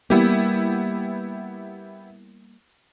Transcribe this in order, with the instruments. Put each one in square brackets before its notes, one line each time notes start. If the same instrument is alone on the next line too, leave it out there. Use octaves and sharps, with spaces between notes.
[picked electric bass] G3 A#3 [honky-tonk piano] B3 E4 G4